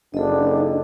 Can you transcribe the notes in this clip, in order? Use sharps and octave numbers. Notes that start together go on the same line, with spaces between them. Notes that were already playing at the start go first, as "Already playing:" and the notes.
F#1 D4 A4 D#5